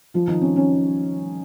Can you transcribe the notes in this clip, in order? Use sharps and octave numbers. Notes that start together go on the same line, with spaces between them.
F3 F4
D#3 D#4
C#4
C#4